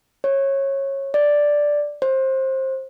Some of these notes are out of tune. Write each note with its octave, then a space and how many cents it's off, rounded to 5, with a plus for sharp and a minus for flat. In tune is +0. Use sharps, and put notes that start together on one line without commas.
C#5 -20
D5 +0
C5 +20